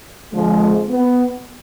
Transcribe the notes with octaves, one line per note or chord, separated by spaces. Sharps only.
F2 D3 F3 G#3
B3